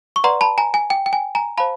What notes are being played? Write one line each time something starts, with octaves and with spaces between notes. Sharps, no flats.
C#6
B4 D5 F#5 A#5 C6
A5 B5
G#5 A#5
G#5
G5
G5
G#5
G#5 A#5
C5 F5 A5 B5